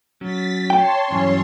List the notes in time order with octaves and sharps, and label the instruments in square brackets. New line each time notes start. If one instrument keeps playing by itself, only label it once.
[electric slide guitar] F#3 C#4 [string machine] A6 B6
[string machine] C#5 A5 C6 [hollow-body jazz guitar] G5
[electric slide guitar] G2 E3 F#3 [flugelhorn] C#4